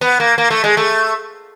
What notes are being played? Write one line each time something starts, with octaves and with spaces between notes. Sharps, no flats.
B3
A#3
A#3
A3
G#3
A3